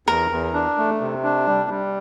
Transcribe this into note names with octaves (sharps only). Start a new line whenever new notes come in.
E2 A#4
E2
D4
A3
C3
D4
G3
G3